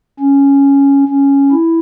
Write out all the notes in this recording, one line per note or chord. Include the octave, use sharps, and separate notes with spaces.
C#4
C#4
E4